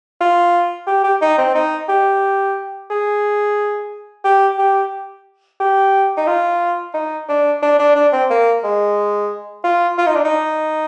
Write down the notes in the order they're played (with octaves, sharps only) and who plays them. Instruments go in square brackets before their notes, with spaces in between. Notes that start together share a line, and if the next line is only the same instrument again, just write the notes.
[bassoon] F4
G4
G4
D#4
C4
D#4
G4
G#4
G4
G4
G4
D#4
F4
D#4
D4
D4
D4
D4
C4
A#3
G#3
F4
F4
D#4
D4
D#4